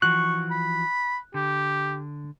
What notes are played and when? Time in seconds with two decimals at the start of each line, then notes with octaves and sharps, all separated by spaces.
0.02 E3 F3 F#4 C#6 F#6
0.51 B5
1.34 D3 G4